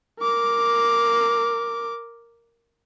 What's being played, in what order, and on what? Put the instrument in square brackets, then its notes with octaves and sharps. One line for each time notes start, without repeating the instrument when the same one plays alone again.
[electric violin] A#4 D6